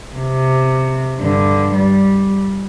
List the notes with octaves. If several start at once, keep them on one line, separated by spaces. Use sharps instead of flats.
C3
G2 D3
G3